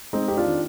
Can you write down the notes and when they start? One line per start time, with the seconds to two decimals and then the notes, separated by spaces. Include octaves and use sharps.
0.13 G#3 C4 D#4
0.28 F2 G4
0.37 D4 F4
0.45 D#3